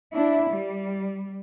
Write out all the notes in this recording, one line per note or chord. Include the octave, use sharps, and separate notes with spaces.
D4 E4
G3